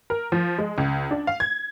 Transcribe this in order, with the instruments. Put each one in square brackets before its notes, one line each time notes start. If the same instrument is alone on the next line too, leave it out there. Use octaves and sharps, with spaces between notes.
[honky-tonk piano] A#4
F3
G#3
C#2
D4
F5
G#6